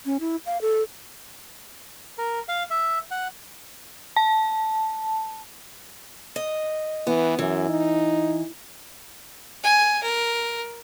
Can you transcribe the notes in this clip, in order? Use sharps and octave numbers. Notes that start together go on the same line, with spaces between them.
C#4
E4
F5
A4
A#4
F5
E5
F#5
A5
D#5
E3 B3
F#2 E3
D#4
G#5
A#4